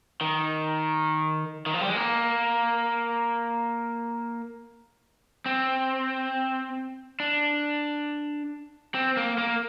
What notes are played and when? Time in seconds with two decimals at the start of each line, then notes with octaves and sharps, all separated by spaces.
0.21 D#3
1.66 D#3
1.74 F3
1.81 G3
1.89 G#3
1.96 A#3
5.46 C4
7.20 D4
8.94 C4
9.17 A#3
9.38 A#3